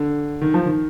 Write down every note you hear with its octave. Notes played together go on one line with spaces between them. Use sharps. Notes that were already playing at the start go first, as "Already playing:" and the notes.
Already playing: D3
D#3
F3
D#3